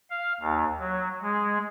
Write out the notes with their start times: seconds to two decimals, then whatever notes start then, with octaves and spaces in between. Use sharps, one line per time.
0.10 F5
0.40 D#2
0.79 F#3
1.22 G#3